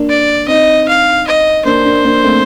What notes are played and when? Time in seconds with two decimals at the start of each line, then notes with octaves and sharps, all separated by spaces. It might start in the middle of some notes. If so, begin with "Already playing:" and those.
Already playing: A#3 D4
0.09 D5
0.48 C4 D#4 D#5
0.88 F5
1.27 D#5
1.65 A#3 D4 C5
1.85 A#3 D4
2.05 A#3 D4
2.24 A3 C4